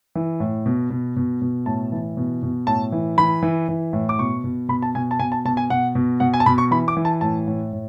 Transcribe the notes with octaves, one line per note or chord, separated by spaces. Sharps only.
E3
A2
B2
B2
B2
B2
A2 A5
E3
B2
B2
A2 A5
E3
E3 B5
E3
E3
A2
D6
B2 C#6
B2
B2 B5
A5
B2 G#5
A5
B2 G#5
A5
B2 A5
G#5
B2 F#5
B2
B2 F#5
G#5
A5
B2 B5
C#6
E3 B5
D6
E3
A5
A2 A5
A2
A2